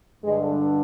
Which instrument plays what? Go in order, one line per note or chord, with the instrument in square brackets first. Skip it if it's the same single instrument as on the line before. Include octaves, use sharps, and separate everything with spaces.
[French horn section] G2 D3 G#3